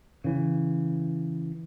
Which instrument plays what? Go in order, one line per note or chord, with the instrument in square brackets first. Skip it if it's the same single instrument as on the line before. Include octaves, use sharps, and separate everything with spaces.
[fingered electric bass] C#3 E3